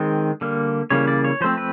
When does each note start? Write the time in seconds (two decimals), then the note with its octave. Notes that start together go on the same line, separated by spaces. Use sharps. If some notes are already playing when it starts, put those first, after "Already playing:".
Already playing: D#3 G#3 C4
0.41 D3 G3 A#3
0.90 C#3 E3 G3 A#3 C#5
1.07 D5
1.24 C#5
1.41 F3 A3 C4 C5
1.57 B4